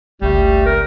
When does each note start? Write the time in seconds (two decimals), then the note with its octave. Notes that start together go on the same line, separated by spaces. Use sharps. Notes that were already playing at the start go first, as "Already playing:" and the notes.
0.22 G1 C#2 G3 A3
0.66 C4 A#4